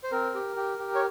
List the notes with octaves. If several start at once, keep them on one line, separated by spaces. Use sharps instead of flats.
C5
C4 A#4
G4
G4
G4
C#5